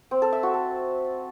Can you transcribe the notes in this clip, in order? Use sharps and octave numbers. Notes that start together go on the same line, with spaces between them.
C4
A4
E5
F#4
A4